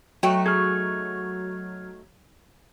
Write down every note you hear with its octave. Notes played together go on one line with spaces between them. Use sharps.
F#3 A3 D#4 F#4 G5
G#4 F6 G#6